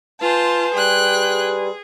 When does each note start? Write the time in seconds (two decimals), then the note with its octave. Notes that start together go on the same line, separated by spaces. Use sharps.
0.21 F4 B4 C5 G#5 A5 C6
0.74 G3 G#4 G5 F#6